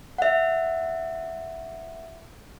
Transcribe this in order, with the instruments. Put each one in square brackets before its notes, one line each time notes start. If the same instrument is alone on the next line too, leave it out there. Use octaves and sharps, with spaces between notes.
[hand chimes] E5 F#5